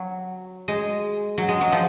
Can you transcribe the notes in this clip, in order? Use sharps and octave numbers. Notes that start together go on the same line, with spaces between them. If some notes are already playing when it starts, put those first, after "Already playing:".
Already playing: F#3
G#3
F#3
G#3
F#3
F3